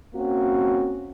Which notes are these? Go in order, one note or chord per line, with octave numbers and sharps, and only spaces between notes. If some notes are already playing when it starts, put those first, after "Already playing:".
A#3 C4 C#4 F#4